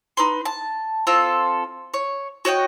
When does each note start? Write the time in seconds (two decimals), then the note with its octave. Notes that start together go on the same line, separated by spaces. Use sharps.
0.17 D#4 B4 C6
0.45 A5
1.07 C4 F4 A4 A5
1.94 C#5
2.45 F#4 C#5 D#5 G5